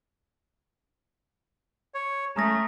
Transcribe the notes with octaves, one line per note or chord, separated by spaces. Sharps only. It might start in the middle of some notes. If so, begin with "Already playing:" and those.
C#5
A3 C#4 A#5 D#6 A#6